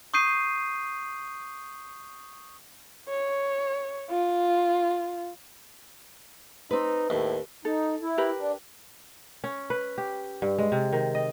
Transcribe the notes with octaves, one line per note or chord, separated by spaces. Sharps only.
C#6 D#6 G6 C7 D#7
C#5
F4
C4 D#4 B4
D#2 A2
D#4 A4
E4
G4 A#4 B4
D4
C#4
B4
G4
G2
G#3
C3
D#3
D#5